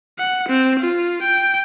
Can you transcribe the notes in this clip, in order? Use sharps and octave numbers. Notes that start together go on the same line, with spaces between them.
F#5
C4
F4
G5